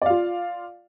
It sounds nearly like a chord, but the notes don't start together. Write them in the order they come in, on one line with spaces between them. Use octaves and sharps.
D5 F5 F4